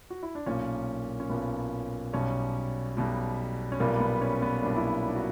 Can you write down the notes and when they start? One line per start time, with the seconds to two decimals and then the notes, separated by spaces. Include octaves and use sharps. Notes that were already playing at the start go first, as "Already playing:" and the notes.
0.10 F#4
0.23 E4
0.35 D4
0.46 B1 A#2 A#3 C#4
1.20 C#4
1.29 B1 A#2 A#3 B3
2.13 B1 B2 G3 C#4
2.97 B1 B2 G3
3.72 C#4
3.80 B1 A#2 G3 A#3 B3
4.00 B3
4.21 C#4
4.42 B3
4.63 B1 A#2 G3 A#3 D4
4.76 E4
4.83 D4
5.05 D4
5.16 F#4